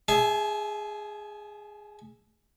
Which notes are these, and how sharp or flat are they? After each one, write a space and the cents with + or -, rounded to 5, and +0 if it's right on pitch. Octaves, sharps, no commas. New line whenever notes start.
G#4 -5 E5 +0 A5 -45